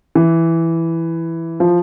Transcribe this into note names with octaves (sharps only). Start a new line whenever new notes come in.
E3
F3